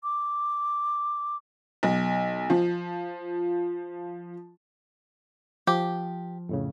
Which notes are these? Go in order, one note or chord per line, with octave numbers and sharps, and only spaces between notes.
D6
B1
F3
F3 G4
F2 A2 C#3